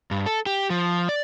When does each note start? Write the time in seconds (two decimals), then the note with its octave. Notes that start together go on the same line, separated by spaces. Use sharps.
0.11 G2
0.26 A4
0.46 G4
0.70 F3
1.09 D5